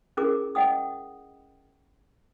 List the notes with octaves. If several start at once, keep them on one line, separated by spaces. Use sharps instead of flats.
C#4 E4 G#4 A#4 D6
D#5 F#5 G5 D#6